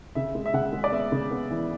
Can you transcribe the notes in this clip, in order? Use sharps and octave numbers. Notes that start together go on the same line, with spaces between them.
C#3 E5
G#3
E5
C#3 F#5
G#3
D5
B3 E5
C#3
B3
E3